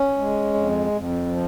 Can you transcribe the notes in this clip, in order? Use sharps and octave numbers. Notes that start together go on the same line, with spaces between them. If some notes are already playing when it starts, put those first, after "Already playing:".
Already playing: C#4
G#3
F2
F2
F3